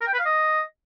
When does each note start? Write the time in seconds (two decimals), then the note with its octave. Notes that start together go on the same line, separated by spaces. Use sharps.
0.01 A#4
0.07 G5
0.13 B4
0.19 F5
0.25 D#5